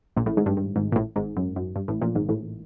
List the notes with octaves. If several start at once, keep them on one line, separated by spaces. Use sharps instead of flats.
A#1 A#2
A1 A2
G#1 G#2
G2
G2
G#1 G#2
A#2
A1 A2
G#1 G#2
F#2
F#2
G2
A1 A2
A#1 A#2
G#1 G#2
A1 A2